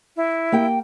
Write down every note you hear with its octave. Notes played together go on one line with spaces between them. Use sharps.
E4
A#3 G4 G5